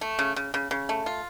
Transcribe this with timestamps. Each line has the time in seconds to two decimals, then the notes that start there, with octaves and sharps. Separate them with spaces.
0.01 A3
0.19 C#3
0.36 C#3
0.54 C#3
0.71 C#3
0.89 A3
1.06 F4